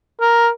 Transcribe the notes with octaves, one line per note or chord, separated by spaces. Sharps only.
A#4